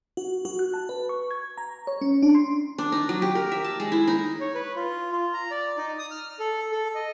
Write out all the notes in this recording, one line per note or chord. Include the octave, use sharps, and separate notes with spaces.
F#4
F#4
F#6
A5
B4
C#6
G#6
A#5
C#5
C#4
D4
C6
D4
D#4
F#3
G4
A#4
E5
A5
G#3
E4
D#4
C#5
B4
F4
F4
A#5
D5
D#4
D#6
F6
A4
A4
D#5